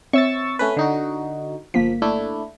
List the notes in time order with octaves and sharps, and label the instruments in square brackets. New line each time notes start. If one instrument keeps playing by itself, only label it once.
[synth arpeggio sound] C4 C#5 E5 [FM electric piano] C#6 E6 A6
[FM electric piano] A3 C#4 B4
D3 D#4 F#4
[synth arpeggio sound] G1 A#3 B6 [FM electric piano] F3
[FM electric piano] A3 D4 E4